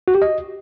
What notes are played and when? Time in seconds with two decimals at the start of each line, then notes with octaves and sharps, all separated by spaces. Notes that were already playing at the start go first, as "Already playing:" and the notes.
0.08 F#4
0.15 G4
0.22 D#5